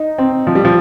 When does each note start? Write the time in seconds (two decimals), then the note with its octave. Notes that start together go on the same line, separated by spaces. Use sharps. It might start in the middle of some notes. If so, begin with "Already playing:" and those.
Already playing: D#4
0.18 C4
0.47 F3
0.55 G3
0.65 F3